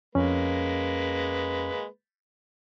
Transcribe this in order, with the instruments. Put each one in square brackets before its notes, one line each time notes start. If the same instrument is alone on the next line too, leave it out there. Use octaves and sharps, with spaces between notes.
[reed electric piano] F2 C#4 [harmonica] G#3 A#3 B4